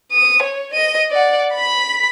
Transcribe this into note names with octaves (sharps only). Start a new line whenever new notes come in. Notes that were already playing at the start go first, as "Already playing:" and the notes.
D#6
C#5
D#5 D#7
D5 F#5
B5 B6